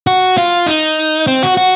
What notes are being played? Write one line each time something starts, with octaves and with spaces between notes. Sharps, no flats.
F#4
F4
D#4
C4
F#4
F#4